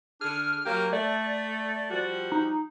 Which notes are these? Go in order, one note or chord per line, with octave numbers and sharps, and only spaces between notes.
D3 D4 G#4 F6
F#3 A#3 G4
A3 D5
F3 G3 F#4
D#4